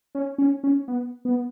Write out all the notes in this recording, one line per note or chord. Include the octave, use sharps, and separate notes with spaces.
C#4
C#4
C#4
B3
B3